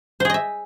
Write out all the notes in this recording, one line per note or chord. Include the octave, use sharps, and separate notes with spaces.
G#4 C5 D#5 E5